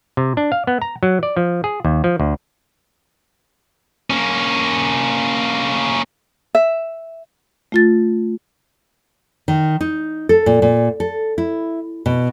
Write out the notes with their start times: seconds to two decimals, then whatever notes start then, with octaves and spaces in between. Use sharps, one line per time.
0.17 C3
0.37 D4
0.52 F5
0.67 B3
0.82 A#5
1.03 F#3
1.23 D5
1.37 F3
1.64 G#4
1.85 D#2
2.04 F3
2.20 D2
4.10 A#3 C#4
6.55 E5
7.72 A3 F4 A6
9.48 D#3
9.81 D#4
10.29 A4
10.46 A#2
10.62 A#2
11.00 A4
11.38 E4
12.06 B2